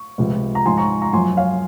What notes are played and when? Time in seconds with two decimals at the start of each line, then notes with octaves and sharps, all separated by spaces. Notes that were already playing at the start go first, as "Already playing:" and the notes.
Already playing: C#6
0.18 C#2 C3 F3
0.55 A#5
0.65 G#2 F3 G#5 C6
0.77 A#5 C#6
1.02 A#5 C#6
1.13 F#2 F3 G#5 C6
1.37 C#5 F5